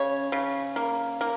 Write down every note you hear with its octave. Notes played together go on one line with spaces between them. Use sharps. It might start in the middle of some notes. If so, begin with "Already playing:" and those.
Already playing: C#3 C#5
C#3
A#3
A#3